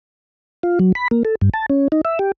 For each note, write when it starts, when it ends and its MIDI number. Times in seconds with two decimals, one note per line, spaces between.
0.63 0.79 65
0.79 0.92 54
0.95 1.08 83
1.11 1.23 58
1.25 1.35 69
1.41 1.49 43
1.54 1.66 81
1.70 1.88 61
1.92 2.01 63
2.05 2.19 76
2.19 2.32 67